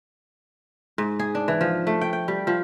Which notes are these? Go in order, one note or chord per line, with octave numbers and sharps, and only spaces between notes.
G#2
G#4
D4
E3
F3
A3
G5
G5
G3
F3